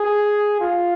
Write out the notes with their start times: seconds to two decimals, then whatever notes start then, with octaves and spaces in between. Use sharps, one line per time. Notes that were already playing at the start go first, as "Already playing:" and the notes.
Already playing: G#4
0.60 F4